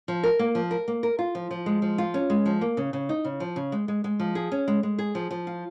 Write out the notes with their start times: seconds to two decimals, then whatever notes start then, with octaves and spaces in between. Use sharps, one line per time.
0.08 F3
0.23 A#4
0.39 A#3
0.55 F3
0.71 A#4
0.88 A#3
1.03 A#4
1.19 F4
1.35 F3
1.51 F3
1.66 G#3
1.82 F3
1.98 F4
2.14 C#4
2.30 G#3
2.46 F3
2.61 A#3
2.77 C#3
2.93 C#3
3.09 D#4
3.25 C#3
3.40 F3
3.56 C#3
3.72 G#3
3.88 G#3
4.04 G#3
4.20 F3
4.35 G#4
4.52 C#4
4.68 G#3
4.83 G#3
4.99 G#4
5.15 F3
5.31 F3
5.47 F4